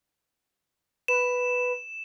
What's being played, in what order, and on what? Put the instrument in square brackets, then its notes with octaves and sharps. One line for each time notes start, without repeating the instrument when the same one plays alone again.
[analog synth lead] B4 [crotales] E7